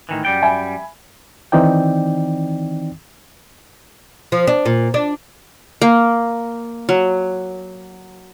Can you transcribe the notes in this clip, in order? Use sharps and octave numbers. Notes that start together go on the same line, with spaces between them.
A2 D#3 E3
F#2 G3 G5
E5 G#5 B5
D#3 E3 C4 D#4 D5 G5
F3
D4
A#2
D4
A#3
F#3